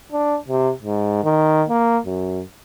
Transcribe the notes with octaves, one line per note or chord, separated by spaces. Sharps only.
D4
C3
G#2
D#3
A#3
F#2